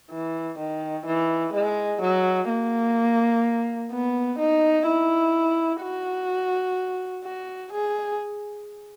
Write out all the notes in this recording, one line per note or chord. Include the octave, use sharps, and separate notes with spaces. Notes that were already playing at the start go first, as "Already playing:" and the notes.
E3
D#3
E3
G#3
F#3
A#3
B3
D#4
E4
F#4
F#4
G#4